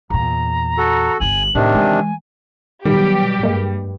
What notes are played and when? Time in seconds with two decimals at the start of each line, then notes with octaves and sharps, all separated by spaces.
0.10 E2 A#2 A#5
0.78 F#4 A4
1.20 G1 D3 G#5 F#7
1.55 A2 C3 D#3 D4
1.74 E3 G#3 G#5
2.85 B2 D#3 F#3 G3 G4
3.43 G2 G#3 A#3